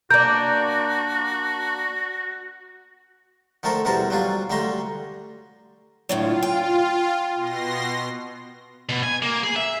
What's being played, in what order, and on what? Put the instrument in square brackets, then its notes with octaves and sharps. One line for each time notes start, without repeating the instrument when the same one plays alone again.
[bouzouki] A#3 D4 [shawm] F#4 [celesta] G6
[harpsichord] D3 D#3 A3 A4 A#4 C5
E2 B2 G3 A#4 C5 A5
F#3 G3 D4 F4
D3 G3 A3 A#5 C6
[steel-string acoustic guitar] A2 D3 F#3 [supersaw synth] F4
[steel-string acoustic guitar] G5
[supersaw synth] B2 C6 A#6
[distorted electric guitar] B2
G#5
A#3
G#4
E5